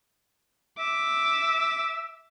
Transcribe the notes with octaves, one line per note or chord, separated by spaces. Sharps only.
E5 D6